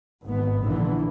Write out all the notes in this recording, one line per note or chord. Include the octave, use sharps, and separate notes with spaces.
G#1 B3
A#1 A#2 D3 E3